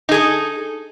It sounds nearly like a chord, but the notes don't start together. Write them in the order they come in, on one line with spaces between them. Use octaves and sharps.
D#4 G#4 A4